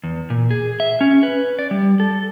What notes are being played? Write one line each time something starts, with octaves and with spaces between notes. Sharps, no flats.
E2
A#2
G#4
E5
C#4
B4
D5
G3
A4